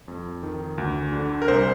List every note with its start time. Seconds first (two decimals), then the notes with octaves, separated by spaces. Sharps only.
0.08 F2
0.43 D#3
0.78 D2
1.12 D3
1.42 A#4
1.48 C2 C5